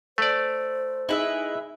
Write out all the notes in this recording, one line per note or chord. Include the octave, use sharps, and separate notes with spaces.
A3 C5 D5
D#4 E4 G#4 B4 E5